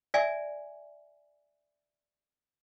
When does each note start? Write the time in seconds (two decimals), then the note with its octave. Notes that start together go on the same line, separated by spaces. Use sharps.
0.14 D5 E5 G#5